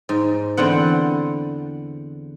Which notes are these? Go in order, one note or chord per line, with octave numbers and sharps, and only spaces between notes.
G#2
E2 D3 C4 F#5